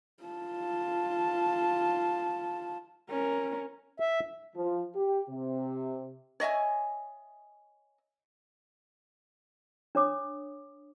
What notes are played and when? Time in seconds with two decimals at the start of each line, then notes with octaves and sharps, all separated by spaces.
0.24 F4 A5
3.10 C#4 A#4
4.00 E5
4.56 F3
4.96 G4
5.30 C3
6.40 C#5 D#5 E5 G#5
9.95 D4 C#5 D6 D#6